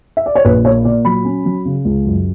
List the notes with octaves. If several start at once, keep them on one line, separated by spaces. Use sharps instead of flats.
E5
D5
C#5
A#1 B4
A#3 C#5
A#2 D5
F#3 B5
C#4
F#3
C#3
C#2
F#2